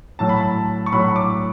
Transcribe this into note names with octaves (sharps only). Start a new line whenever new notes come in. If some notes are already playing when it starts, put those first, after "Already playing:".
A2 F#3 A5
B5
A5
C#6
A2 F#3 B5
D6